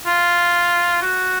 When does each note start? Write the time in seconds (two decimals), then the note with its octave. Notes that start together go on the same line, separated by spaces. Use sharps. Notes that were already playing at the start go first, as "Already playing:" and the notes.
0.06 F4
1.02 F#4